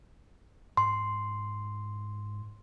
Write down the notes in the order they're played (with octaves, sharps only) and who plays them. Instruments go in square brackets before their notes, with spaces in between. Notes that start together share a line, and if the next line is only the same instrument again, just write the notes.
[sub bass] G#2 [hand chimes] C6